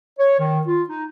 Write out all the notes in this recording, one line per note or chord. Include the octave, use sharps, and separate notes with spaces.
C#5
D#3
F4
D#4